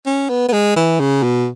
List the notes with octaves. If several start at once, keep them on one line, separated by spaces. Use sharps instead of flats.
C#4
B3
B3
G#3
E3
C#3
B2